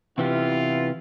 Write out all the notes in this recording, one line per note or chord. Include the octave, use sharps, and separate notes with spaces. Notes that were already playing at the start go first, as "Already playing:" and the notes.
C3 E3 B3 E4 F4 G4